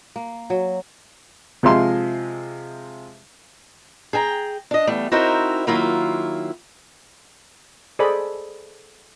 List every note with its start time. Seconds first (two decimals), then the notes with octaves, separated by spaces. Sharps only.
0.16 A#3
0.50 F#3
1.63 C3 F3 G#3 F4 E5 C6
4.13 G#4 G5 G#5 A#5
4.71 D4 D#5
4.87 E2 G3 A3
5.12 C4 D#4 E4 F#4 A#4 C5
5.67 D#3 F#3 A#3 E4 F4
7.99 G#4 A4 C5 D5 D#5 B5